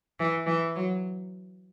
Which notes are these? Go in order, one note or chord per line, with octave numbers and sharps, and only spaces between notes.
E3
E3
F#3